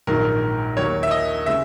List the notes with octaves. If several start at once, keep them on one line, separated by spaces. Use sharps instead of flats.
A#1 G#2 D#3 F#3 A#4
D#2 D#3 F#3 A#3 C#5
E5
D#5
C#3 G#3 E5